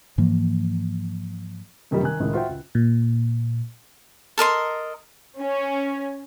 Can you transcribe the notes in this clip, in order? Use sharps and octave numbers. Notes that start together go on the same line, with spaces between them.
G#2 E3 F3 A#3
F#2 D#3 F#3 G3 A3
D#3 G#5 F#6
C#2 A2 D#3 G#3
F4 F#4 C5 E5 G5
C#2
A#2
A4 A#4 D#5 C6
C#4